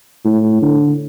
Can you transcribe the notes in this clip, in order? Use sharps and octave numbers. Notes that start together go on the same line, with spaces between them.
A2
D3